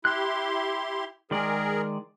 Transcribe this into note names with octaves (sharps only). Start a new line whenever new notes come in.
E4 G4 C6 F#6
D#3 G#3 G#4 A#4 D5